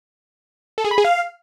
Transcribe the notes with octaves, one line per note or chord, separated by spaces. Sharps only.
A4
G#4
B5
G#4
F5